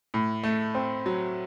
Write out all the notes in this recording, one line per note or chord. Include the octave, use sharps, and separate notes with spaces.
A2
A3
C4
F#3